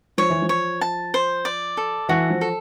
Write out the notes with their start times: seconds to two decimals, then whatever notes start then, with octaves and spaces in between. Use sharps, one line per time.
0.18 F3 C#5
0.30 E3
0.42 F3
0.49 C#5
0.81 A5
1.14 C5
1.45 D5
1.77 A4
2.09 E3 F#4
2.30 F3
2.41 A4